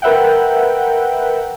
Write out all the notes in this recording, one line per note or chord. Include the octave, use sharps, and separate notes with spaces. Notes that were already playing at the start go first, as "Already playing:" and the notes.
A#4 B4 E5 F#5 G5